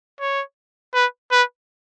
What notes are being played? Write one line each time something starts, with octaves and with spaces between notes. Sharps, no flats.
C#5
B4
B4